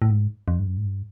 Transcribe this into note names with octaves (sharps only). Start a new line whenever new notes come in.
A2
G#2
F2
G2
F#2
G#2
G2